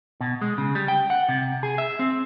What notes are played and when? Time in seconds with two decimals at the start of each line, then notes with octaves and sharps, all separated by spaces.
0.21 B2
0.42 G#3
0.58 C#3
0.75 G3
0.88 G5
1.10 F#5
1.29 C3
1.63 G#4
1.78 E5
1.99 C4